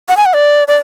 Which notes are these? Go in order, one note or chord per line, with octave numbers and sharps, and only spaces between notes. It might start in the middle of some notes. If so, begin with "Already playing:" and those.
F#5
G#5
F#5
D5
D5